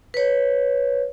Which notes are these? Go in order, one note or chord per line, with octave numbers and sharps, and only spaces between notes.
B4 C#5